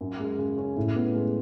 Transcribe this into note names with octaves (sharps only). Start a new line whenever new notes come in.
F#2
G#3
C#3
C#4
A2
B3
G#3